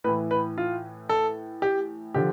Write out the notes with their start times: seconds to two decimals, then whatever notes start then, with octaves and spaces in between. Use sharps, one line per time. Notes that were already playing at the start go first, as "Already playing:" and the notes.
0.04 A2 B4
0.08 E3
0.31 B4
0.58 F4
1.09 A4
1.62 G4
2.14 D3 F3 G4